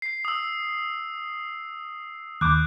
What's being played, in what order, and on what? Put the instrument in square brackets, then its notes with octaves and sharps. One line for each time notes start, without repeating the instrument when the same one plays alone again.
[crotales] C7
D#6 E6
[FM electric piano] D#2 D6 [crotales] F#6 G6